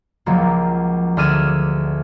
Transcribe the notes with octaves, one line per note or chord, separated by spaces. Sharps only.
C#2 F3 F#3 A#3
D2 D4 G#4 E6 F6 D#7